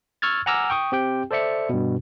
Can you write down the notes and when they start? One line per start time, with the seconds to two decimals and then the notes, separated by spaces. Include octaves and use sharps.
0.22 C#6 E6 F6 G#6 A6
0.46 F#5 G#5 A#5 D6 E6 F6
0.70 G5 C#6 D#6
0.92 C4 G4 G5
1.31 A4 C5 D5 E5 C#7
1.69 G2 B2